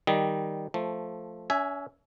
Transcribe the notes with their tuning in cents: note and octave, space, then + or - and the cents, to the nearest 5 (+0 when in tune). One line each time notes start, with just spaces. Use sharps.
D#3 +0 G3 +0 D#5 +0
F3 +0 A3 +0
C#4 +35 E5 +0 G#5 +0